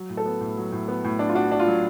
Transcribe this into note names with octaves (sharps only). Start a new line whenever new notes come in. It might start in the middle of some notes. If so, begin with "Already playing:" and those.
Already playing: F#3
A2
A4
B3
A2
F#3
A2
B3
A2
D4
F4
D4 F#4
D4
F4
F#3